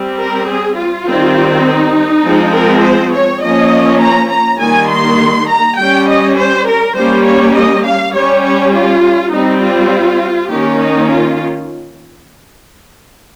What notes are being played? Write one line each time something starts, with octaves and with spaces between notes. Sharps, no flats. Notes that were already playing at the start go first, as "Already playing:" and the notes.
Already playing: G3 C4
A#4
G#4
F4
D#3 G3 C4
D#4
F3 G#3 C4
A#4
C5
C#5
F3 A#3 C#4 D#5
A#5
A#5
D#3 G3 A#3 G#5
C6
A#5
G3 C#4 G5
D#5
C5
A#4
G3 A#3 C#4 C5
C#5
D#5
F5
G3 C#4 C#5
C#5
F4
G3 C4 D#4
F4
D#3 A#3 C#4 G4
D#4
F4